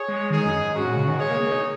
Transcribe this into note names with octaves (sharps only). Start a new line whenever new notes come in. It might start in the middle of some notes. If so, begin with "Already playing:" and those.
Already playing: G#4 C#5
G#3
D#3 D#4 G#4
F#2
G#2
G#2 C#4 F#4
A#2
C#3
D#3
G#3 G#4 C#5
A#3
A#3
D#4